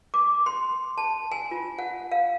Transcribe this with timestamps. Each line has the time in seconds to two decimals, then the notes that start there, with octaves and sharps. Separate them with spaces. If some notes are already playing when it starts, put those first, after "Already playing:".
0.14 D6
0.46 C6
0.97 A5
1.31 G#5
1.51 F4
1.79 F#5
2.12 F5